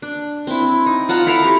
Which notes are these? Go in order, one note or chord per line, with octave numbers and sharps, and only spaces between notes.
D4
C4 E4
D#4
F4 F#5 A5 A#5
E4 A4 F5 A#5
G4